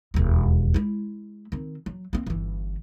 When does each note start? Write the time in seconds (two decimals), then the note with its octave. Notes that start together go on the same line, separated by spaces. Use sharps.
0.14 E1 D#2
0.74 G#3 E4
1.52 D#3 C4
1.86 F#3
2.13 A#3 C4
2.26 G1 E3